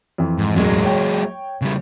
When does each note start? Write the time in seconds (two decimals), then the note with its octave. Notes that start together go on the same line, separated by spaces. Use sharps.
0.18 F2 E3
0.39 G#2
0.56 E1 A1 F#2 F#3 G#3
0.83 C#5 G5
1.62 C#3 G3